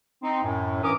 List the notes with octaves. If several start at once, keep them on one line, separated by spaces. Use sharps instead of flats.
C4 D#4
F#2 A2
G2 E3 C#4 A#4 D6 D#6